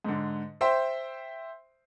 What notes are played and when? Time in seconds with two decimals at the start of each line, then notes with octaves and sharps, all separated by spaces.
0.04 G#2 D3
0.61 C5 E5 G5 C6